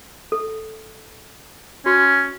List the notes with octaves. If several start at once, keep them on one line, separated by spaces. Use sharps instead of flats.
A4
C#4 F#4